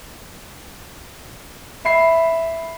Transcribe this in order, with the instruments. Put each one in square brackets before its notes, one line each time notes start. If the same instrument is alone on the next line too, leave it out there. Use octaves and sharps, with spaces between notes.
[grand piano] E5 B5 C7